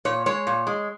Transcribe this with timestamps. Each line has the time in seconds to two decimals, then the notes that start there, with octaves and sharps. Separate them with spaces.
0.05 A#2 C#5
0.26 G#3 C#5
0.47 A#2
0.67 G#3